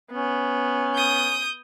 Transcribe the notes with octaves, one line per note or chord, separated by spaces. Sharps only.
B3 C#4
D#6 G6